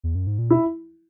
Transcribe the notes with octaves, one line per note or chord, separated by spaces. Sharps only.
E2
F#2
G#2
A#2
B2 E4